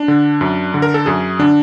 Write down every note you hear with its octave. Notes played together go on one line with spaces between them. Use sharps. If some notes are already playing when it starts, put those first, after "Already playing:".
Already playing: D4
D3
F#2
D3
A#4
A4
F#2 G#4
D3 D4